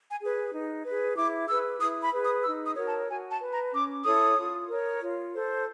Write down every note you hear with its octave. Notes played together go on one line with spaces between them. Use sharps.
G#5
G#4 B4
D#4
G#4 B4
E4 D6
G#4 B4 E6
E4 D#6
B5
G#4 B4
D#6
D#4 E6
D#6
F#4 A#4 C#5
A5
F#4 G#5
A5
B4
A#5
C#4 D6
E4 A4 C#5 D#6
F4
A#4 C#5
F4
A4 C5